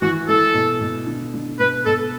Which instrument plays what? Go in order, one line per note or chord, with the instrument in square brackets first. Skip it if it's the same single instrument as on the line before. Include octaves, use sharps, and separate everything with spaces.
[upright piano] E3 [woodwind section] F#4
[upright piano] E3 [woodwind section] A4
[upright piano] B2
B2
D3
D3
[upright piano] B2 [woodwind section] B4
[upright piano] B2 [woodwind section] A4